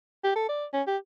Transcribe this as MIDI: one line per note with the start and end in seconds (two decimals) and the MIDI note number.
0.24 0.35 67
0.36 0.47 69
0.49 0.65 74
0.73 0.82 61
0.87 0.97 67